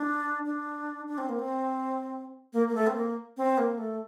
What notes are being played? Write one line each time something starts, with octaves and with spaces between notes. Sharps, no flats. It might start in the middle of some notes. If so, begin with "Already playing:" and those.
Already playing: D4
D4
D4
C4
A#3
C4
A#3
A#3
A3
C4
A#3
C4
A#3
A3